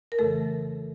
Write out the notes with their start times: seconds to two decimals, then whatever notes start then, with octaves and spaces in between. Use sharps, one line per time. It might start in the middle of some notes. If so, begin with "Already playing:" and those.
0.12 A#4
0.19 F2 C#3 E3 A3 A4